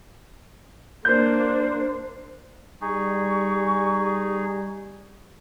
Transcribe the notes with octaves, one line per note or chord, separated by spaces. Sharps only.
A#3 D4 C5 G6
G3 D#4 G#4 C#6